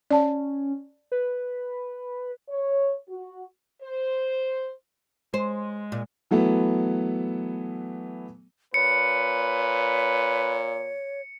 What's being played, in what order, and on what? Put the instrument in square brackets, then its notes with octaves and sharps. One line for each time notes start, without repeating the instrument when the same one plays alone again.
[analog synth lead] C#4 [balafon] D5 A5
[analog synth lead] B4
[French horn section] C#5
F#4
C5
[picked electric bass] G#3 [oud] C5
[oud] A#2
[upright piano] E3 F#3 A3 B3
[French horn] A#2 [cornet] B4 [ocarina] C#5 [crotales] C#7